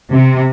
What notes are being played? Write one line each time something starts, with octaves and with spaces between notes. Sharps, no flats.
C3